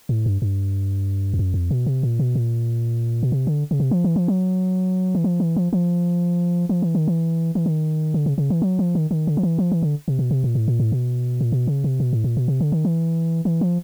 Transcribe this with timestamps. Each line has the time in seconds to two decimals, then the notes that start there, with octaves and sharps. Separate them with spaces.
0.09 A2
0.26 G2
0.42 G2
1.34 F2
1.39 F#2
1.54 F2
1.71 B2
1.86 C3
2.03 A#2
2.19 B2
2.35 A#2
3.23 B2
3.32 C3
3.47 D3
3.71 C#3
3.80 C3
3.91 F3
4.04 E3
4.16 F3
4.28 F#3
5.15 E3
5.24 F3
5.40 E3
5.56 F3
5.73 F3
6.69 F3
6.82 E3
6.95 D#3
7.08 E3
7.55 E3
7.66 D#3
8.14 D3
8.26 C#3
8.38 C#3
8.50 E3
8.62 F#3
8.79 F3
8.95 D#3
9.11 D#3
9.27 D3
9.37 F3
9.43 E3
9.59 F3
9.72 E3
9.82 D3
10.08 C3
10.19 B2
10.31 C3
10.44 A#2
10.55 A2
10.68 A#2
10.80 A2
10.92 B2
11.41 A#2
11.52 B2
11.67 C#3
11.84 C3
12.00 B2
12.13 A2
12.24 A#2
12.37 B2
12.48 C3
12.60 D3
12.72 D#3
12.85 E3
13.45 E3
13.61 F3